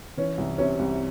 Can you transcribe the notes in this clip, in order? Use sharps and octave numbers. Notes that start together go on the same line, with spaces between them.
E3 C#4
C2
C3 C#4
C2